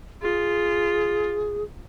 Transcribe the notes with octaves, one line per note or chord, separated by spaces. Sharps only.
F4 G#4